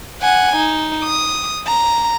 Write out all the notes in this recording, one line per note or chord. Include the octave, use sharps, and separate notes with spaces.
F#5 G#5
D#4
D#6
A#5